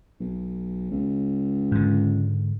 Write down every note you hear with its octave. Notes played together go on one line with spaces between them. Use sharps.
B1
C#2
G#2 D3